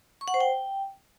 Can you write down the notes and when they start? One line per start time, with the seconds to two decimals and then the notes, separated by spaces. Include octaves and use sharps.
0.21 C#6
0.28 F#5
0.34 C5
0.41 G5